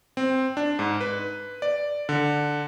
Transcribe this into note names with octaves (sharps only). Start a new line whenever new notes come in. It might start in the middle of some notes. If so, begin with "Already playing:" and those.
C4
D4
G#2
B4
D5
D3